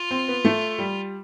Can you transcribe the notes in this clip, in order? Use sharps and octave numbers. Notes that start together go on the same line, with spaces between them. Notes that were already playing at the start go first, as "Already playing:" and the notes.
Already playing: F4
C4
B3
A3
G3